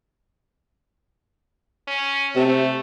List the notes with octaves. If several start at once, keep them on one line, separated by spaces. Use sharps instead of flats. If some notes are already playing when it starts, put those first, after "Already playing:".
C#4
C3 A3